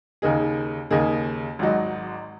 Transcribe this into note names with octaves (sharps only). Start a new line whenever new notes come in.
D#2 C#3 A#3 D#4 G#4
D#2 C#3 A#3 D#4 G#4
G#1 G#2 F#3 D#4